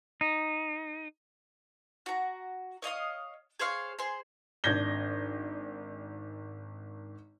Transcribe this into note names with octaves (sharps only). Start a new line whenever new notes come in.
D#4
F#4 A#5
C#5 D#5 F5 D#6
G#4 C5 C#5 F5
G#4 C5 C6
G#1 D4 G6 G#6 A#6 G7